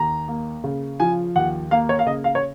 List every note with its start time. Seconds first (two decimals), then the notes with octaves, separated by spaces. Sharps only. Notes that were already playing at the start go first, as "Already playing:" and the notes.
Already playing: D#2 A#5
0.28 A#3
0.64 C#3
1.00 F3 G#5
1.36 D#2 F#5
1.71 A#3 F5
1.89 C#5
1.99 F5
2.06 C#3 D#5
2.24 F5
2.35 C#5